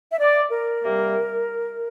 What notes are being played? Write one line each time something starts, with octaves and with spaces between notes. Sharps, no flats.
E5
D5
A#4
C3 G3 A#3